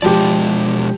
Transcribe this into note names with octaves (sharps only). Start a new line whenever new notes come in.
B2 F3 G#3 G4 D5